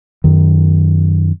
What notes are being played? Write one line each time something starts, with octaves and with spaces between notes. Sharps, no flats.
F#2 D#3